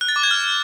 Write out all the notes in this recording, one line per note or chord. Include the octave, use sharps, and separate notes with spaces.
F#6
A6
D6
G#6
F6